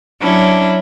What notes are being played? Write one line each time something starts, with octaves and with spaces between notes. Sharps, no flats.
F#3 C#4 D4 E4